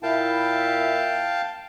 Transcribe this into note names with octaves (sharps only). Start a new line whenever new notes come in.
A#2 E4 E5 F5 G5 A5